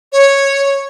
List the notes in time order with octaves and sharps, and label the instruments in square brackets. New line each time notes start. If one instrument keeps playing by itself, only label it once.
[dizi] C#5